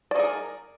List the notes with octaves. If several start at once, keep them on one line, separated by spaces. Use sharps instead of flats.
D#4 G#4 A#4 D5